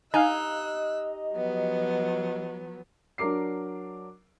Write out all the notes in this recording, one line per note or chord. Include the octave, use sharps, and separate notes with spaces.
D#4 G4 D#5 F5 G#5 E6 F#6
F3 F#3 B3
F#3 D4 A#4 D6 C7